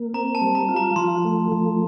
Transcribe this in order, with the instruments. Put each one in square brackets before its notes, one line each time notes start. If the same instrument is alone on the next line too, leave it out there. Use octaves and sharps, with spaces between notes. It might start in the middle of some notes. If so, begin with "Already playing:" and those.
Already playing: [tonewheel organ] A#3
[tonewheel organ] C4 [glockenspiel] A#5
[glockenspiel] A5
[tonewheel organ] G3
[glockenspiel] A#5
[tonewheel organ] F4
[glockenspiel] A#5
[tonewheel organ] F3 [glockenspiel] C6
[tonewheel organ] A3
F3